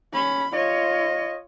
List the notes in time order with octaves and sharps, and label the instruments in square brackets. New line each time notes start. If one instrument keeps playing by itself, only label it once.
[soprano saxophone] C#4 [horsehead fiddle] B5
[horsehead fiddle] F4 C#5 [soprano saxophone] D#5